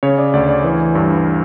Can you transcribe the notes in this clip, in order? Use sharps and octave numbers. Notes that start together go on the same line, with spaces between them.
C#3 C#5
D5
D2 D5
D5
E3
G2